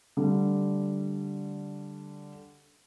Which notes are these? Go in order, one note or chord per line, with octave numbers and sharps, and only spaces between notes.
D3 G3 A3